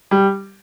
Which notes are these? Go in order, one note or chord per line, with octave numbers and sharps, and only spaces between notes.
G3